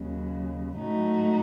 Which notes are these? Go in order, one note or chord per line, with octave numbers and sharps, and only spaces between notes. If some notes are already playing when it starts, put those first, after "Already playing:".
Already playing: D#2 C#3 F#3
A2 F#3 A3 D#4 F#4